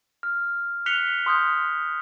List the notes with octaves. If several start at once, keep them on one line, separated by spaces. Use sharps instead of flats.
F6
F6 F#6 B6 C#7 F7 G7
C6 D#6 F6 G6